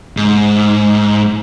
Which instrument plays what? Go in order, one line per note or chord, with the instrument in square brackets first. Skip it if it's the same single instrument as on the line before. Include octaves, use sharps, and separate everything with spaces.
[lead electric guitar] G#2